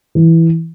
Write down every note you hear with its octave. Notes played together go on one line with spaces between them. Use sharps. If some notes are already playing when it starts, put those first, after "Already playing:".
E3